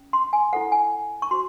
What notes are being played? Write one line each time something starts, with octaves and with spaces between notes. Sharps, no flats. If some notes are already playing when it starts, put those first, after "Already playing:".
Already playing: C#4
C6
G#5
E4 A4 C5 F#5
G#5
C#6
F#4 C5 C6